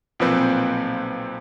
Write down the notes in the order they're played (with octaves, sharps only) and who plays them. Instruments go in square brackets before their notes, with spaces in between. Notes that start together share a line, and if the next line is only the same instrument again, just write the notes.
[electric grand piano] B1 A#2 F3 C4 B4 C5